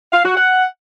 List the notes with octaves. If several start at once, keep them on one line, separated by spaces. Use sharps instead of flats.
F5
F#4
F#5